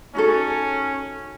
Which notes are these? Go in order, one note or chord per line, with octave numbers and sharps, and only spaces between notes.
C#4 D#4 F#4 A4